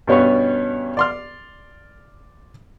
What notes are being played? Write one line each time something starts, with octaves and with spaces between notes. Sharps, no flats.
G2 B2 C#4 B4 C#5
D5 C6 F6